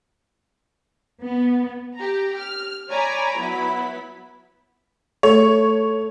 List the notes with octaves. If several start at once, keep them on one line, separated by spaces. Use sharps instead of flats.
B3
G4 A#5
F6
C#5 D5 G#5 A#5 B5
F#3 B3 E4 B5
A3 C#5